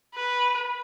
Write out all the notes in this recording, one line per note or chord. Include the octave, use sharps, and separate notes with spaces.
B4